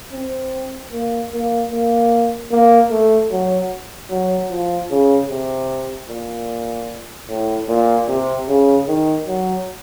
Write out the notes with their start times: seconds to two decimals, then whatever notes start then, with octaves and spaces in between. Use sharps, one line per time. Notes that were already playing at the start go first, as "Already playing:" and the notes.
0.12 C4
0.92 A#3
1.32 A#3
1.72 A#3
2.51 A#3
2.91 A3
3.31 F#3
4.10 F#3
4.51 F3
4.91 C#3
5.30 C3
6.09 A#2
7.29 A2
7.69 A#2
8.08 C3
8.48 C#3
8.88 D#3
9.27 F#3